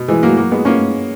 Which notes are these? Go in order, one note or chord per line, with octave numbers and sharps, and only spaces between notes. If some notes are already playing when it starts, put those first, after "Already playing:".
Already playing: B2
E3 G#3
F#3 A#3
F#3 A#3
G#3 B3
A#3 C#4